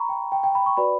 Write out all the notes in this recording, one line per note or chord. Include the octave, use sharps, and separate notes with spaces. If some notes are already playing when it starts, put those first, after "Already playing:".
Already playing: A#5 B5 C#6
G5
G5
G5
B5
C#6
F#4 B4 D5 B5